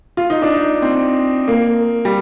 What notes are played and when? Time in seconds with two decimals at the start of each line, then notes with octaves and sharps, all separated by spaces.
0.17 F4
0.30 D#4
0.42 D4
0.55 D#4
0.82 C4
1.48 A#3
2.05 G3